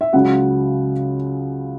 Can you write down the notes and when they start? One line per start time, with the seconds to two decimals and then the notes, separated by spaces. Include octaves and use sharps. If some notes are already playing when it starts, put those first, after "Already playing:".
0.01 E5
0.13 C#2 C#3 F#3 F#5